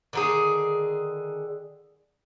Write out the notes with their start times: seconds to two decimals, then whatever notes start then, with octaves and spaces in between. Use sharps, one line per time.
0.13 D3 D#3 G#4